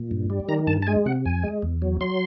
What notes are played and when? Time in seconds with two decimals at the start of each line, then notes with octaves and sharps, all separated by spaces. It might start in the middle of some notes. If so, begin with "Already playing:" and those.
Already playing: A#2
0.11 G2
0.30 G3
0.48 D#3 A#5
0.67 G2 A5
0.82 A5
0.87 G#3 G#5
1.06 C3 F#5
1.25 F2 G#5
1.43 G#3
1.62 E2
1.82 F#3
2.01 F#3 C6